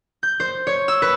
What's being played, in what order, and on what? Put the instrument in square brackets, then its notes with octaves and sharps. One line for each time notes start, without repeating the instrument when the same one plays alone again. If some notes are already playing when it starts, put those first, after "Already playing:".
[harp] G6
C5
C#5
E6
B4